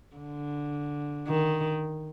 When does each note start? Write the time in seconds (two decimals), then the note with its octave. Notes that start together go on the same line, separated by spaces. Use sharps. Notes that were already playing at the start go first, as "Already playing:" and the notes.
0.16 D3
1.27 D#3